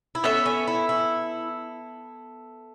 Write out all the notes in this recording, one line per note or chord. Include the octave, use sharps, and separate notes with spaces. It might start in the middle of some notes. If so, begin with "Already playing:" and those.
E4
B3 C#4 A4 E5
C#4
E4
E4